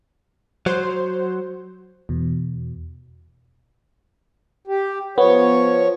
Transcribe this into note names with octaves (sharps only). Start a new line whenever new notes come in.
F#3 C5
E2 B2
G4
F3 B3 C#5